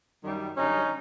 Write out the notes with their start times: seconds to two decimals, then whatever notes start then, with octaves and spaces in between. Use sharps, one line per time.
0.23 F#2 D#3 G3
0.56 F#2 D3 G3 C#4 D#4